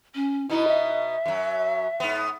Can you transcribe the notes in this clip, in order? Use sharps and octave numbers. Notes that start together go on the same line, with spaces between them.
C#4
B2 B3 D#4 E4
E5
F#2 F#3
G#2 B3